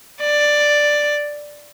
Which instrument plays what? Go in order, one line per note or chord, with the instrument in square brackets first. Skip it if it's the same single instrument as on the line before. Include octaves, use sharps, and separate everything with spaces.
[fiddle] D5